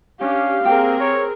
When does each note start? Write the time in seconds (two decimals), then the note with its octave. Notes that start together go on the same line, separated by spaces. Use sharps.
0.21 C#4 D4 G4 F5
0.65 A#3 C4 G4 G#4 A#4
1.00 C#5